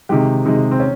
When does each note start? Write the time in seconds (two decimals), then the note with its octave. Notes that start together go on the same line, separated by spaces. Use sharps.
0.09 C3 D#3 G#3 G4
0.45 C3 D#3 G#3 D#4
0.71 C4
0.80 C#4